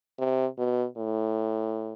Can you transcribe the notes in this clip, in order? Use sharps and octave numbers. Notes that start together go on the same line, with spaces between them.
C3
B2
A2